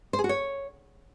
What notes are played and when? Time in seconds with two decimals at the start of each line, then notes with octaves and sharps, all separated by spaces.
0.13 C5
0.19 G#4
0.24 F#4
0.29 C#5